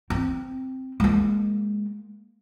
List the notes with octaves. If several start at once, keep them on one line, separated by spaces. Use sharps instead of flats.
C4
G#3 A#3